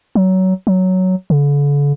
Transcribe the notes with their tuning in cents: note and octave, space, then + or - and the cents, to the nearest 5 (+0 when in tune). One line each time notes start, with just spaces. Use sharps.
F#3 +20
F#3 +5
D3 -40